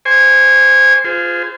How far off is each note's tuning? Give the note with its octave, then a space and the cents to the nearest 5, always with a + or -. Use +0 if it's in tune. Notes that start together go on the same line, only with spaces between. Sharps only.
C5 +0 G#5 -15 C#6 +45
F4 +0 G#4 +0 C5 -30